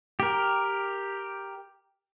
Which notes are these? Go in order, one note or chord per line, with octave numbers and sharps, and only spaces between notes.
G4 A#4